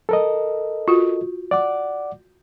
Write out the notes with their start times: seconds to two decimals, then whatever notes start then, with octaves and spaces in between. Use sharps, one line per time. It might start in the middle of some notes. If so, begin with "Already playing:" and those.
0.09 A4 A#4 D#5
0.88 F4 F#4
1.51 D5 F#5 D6